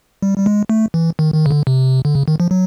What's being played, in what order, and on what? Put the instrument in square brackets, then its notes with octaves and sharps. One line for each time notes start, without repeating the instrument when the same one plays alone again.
[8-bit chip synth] G3
G3
G#3
A3
E3
D#3
D#3
C#3
D3
C3
D3
C#3
D#3
F3
F#3